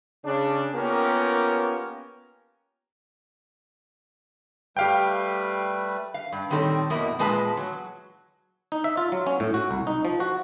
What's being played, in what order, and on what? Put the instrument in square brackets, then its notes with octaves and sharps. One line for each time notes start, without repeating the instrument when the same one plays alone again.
[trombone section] C#3 D4
A#3 B3 C#4 F4 G4 A#4
[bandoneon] G3 A3 B4 [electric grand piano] G4 F5 G5
[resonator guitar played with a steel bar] F5
G2
A#2 D#3 G3 C4 A4 C#5
F2 B2 A#3 E4
E2 A#2 G#3 B3 B4 A5
F#3
[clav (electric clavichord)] D#4
E5
F4
F#3
C#4
A2
F#4
C2
D#4
F3
F#4